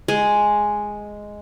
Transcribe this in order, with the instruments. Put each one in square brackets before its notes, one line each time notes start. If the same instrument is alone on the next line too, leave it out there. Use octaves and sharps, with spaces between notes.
[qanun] G#3